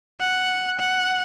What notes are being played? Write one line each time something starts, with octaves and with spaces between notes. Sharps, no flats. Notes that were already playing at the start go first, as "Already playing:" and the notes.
F#5
F#5